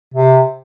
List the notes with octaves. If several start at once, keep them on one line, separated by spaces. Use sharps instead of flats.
C3